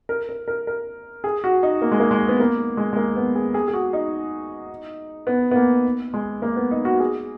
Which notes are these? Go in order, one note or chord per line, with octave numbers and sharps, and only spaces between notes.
A#4
A#4
A#4
A#4
G#4
F#4
D#4
A#3
G#3
A#3
G#3
B3
A#3
G#3
G#3
A#3
B3
G#4
G#4
G#4
F#4
D#4
B3
B3
A#3
G#3
A#3
B3
D#4
F#4
G#4